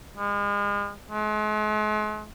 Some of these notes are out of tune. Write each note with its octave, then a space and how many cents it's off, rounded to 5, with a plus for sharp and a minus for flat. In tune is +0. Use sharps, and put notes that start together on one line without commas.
G#3 -40
G#3 +45